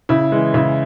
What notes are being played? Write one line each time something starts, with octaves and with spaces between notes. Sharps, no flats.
C#3 E4
E3 G#3
C#3 E4